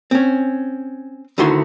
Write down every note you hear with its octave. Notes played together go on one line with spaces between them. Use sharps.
C4 C#4
D2 D3 D#3 E4 F#4 C6